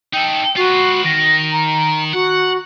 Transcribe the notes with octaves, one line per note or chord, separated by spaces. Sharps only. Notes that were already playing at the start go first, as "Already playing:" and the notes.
D#4 A4 G5
F4 F#4 B4
D#3 A#6
A#5
F#4 F#5